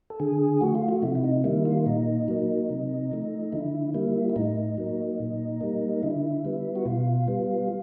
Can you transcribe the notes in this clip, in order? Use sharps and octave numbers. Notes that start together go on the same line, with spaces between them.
A4
D3 G#4
F3 A3 F#4
F4
F#4
C3 E4
E4
D#4
D#3 G3 A#3 E4
F4
A#2 D#4
F#3 A#3
C3
F3 A3
D3 E4
G3 A#3 E4
E4
A2 D#4
F#3 A#3
A#2
G3 A#3
D3 E4
G3 B3
F#4
B2 F4
G3 B3